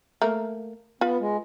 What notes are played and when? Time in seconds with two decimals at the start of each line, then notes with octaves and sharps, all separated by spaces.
0.22 A3 A#3 A#4
1.01 B3 F4 B4 B5
1.20 G#3